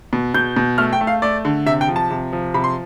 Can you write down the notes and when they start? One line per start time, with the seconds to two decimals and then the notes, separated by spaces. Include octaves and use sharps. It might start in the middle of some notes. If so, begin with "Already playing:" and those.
0.13 B2
0.34 B2 G6
0.56 B2
0.78 A3 F6
0.93 G5
1.01 A3
1.07 F5
1.22 A3 D5
1.45 D3
1.66 C3 E5
1.81 G5
1.88 F3
1.96 A5
2.10 C3
2.33 F3
2.54 C3 B5
2.64 C6